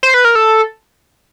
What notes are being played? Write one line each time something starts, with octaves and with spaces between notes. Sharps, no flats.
C5
B4
A#4
A4